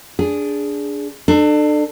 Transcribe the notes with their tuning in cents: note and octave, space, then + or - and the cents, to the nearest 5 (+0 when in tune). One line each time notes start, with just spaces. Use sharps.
D4 -15 G#4 +0
D4 +35 A4 +0